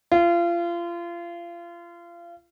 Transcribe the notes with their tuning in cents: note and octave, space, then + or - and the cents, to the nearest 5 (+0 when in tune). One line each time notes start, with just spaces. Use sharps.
F4 -30